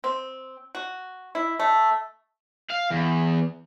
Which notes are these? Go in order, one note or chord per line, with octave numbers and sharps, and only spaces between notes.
C4
F#4
E4
A3
F5
E2